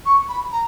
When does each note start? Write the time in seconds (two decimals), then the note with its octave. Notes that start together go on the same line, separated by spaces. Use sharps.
0.06 C#6
0.29 B5
0.52 A#5